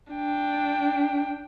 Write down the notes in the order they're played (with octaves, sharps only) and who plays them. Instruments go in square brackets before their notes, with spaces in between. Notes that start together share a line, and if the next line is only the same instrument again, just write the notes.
[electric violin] D4 G5